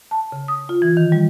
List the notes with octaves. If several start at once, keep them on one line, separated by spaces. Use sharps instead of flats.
A5
C#3
D#6
F4
E3
D#3
G3